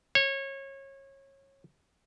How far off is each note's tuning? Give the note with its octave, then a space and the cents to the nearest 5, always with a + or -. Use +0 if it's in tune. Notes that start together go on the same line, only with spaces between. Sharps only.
C#5 -25